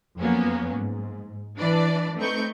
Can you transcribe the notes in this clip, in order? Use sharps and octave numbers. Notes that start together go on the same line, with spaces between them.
F2 F3 F#3 A#3 B3 C#4
G#2
E3 D4 B4 D5
A3 C4 D#4 B4 C#6 G6